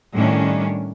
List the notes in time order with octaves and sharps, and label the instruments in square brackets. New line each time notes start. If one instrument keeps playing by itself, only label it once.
[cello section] A2 D#3 G3 C#4 D4